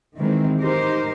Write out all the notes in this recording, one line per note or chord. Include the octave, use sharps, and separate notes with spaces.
D#3 E3 G#3 C4
D#4 G4 A#4 C5